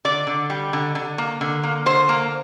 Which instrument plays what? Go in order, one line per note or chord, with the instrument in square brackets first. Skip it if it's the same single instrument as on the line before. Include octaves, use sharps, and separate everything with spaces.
[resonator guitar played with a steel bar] D3 D5
D3
G3
D3
D3
A#3
D3
A#3
D3 C5
A#3